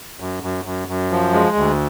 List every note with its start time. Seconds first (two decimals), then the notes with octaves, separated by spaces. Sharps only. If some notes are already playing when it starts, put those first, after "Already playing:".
0.20 F#2
0.43 F#2
0.65 F#2
0.88 F#2
1.11 F3
1.33 G#3
1.56 D2